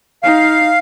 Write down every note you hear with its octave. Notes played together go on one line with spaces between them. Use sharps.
D#4 F5